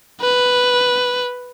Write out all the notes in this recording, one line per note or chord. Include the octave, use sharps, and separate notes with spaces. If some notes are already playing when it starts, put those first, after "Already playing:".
B4